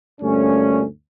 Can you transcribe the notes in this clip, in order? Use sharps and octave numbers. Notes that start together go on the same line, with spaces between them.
D2 G2 A#2 A3 C#4